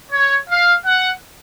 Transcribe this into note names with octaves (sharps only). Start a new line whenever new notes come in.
C#5
F5
F#5